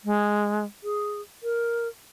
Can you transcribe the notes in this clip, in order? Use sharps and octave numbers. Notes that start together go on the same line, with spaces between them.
G#3
G#4
A#4